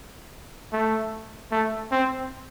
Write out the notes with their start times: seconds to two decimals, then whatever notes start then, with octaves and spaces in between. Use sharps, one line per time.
0.73 A3
1.51 A3
1.92 C4